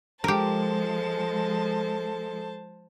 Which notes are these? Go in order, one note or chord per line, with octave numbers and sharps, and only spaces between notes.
F3 G#3 G4 A4 A#4 C5 A5